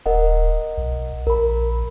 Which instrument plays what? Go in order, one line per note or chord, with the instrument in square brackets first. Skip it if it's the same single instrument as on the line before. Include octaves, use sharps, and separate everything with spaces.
[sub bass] D1 [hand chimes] A#4 D#5 F#5
[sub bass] B1
[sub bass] A#1 [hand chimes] A#4 B5